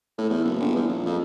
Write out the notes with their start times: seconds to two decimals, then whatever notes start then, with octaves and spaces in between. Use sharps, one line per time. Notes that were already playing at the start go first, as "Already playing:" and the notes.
0.18 A2
0.30 E2
0.45 F#1
0.60 G1
0.76 E2
0.87 A#1
1.06 F2